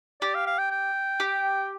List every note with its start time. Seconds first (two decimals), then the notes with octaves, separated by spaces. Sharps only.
0.22 G4 D5
0.35 F5
0.47 F5
0.58 G5
0.71 G5
1.20 G4